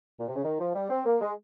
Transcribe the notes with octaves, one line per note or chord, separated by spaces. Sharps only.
A#2
C3
C#3
D#3
F3
G3
C4
A#3
G#3